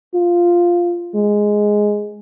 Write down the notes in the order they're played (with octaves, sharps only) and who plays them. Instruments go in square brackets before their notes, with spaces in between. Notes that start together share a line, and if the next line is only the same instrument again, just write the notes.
[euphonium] F4
G#3